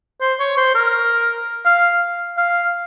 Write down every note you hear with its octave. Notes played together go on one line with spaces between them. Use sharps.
C5
C#5
C5
A#4
F5
F5